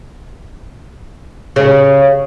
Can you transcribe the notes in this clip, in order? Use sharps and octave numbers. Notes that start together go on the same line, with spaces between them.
C#3